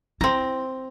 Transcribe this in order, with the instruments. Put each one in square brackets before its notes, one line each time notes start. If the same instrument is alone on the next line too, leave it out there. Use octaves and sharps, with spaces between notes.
[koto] C4 A#5 [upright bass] E4